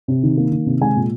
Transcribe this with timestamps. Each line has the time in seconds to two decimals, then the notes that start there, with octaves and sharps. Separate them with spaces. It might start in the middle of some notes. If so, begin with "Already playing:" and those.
0.08 C3
0.23 D#3
0.37 A#3
0.52 D#3
0.66 C3
0.81 G#3 G#5
0.96 A#2